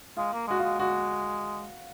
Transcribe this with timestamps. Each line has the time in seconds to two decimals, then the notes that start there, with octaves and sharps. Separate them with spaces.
0.17 G#3 F4
0.33 A#3
0.48 G#3 F#4
0.59 F4
0.64 G#3
0.79 G#3 F#4